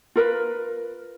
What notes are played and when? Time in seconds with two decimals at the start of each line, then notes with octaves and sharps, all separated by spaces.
0.16 F4 A#4 B4